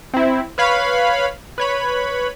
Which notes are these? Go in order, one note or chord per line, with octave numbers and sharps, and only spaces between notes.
C4 E4
B4 C#5 F5 B5
B4 C#5 B5